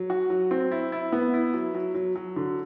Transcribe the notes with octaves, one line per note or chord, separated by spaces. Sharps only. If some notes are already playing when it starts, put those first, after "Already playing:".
Already playing: F#3
F#4
F#3
C4
E4
E4
B3
E4
F#3
F#3
F#3
F#3
D3